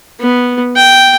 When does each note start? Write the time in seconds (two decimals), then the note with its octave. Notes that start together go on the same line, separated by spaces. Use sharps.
0.20 B3
0.76 G5